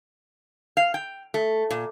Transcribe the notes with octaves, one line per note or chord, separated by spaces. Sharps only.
F5
G5
A3
A#2